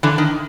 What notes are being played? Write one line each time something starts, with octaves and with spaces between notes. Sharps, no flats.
D3 E3
D#3